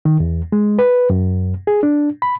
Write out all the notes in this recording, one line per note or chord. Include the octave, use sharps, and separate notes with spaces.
D#3
E2
G#3
B4
F#2
G#4
D4
B5